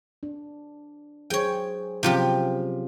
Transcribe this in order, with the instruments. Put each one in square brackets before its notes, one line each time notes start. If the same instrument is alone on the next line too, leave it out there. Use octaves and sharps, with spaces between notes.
[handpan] D4
[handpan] F#3 G#4 C5 [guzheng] C#5 G5
[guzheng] C3 F3 G4 [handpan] F#3 C#4 F4